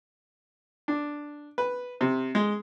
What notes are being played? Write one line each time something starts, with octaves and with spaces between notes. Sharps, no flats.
D4
B4
C3
G#3